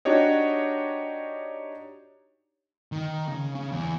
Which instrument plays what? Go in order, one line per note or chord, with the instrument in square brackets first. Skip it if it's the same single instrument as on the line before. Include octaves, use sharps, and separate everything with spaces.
[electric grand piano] D4 D#4 F#4 G4 C#5 D#5
[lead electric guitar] D#3
C#3
C#3
E2